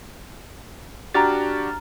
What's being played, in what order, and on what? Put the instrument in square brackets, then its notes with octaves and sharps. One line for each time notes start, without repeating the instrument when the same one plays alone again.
[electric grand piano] D4 F#4 G4 [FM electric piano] A#5 F6 A6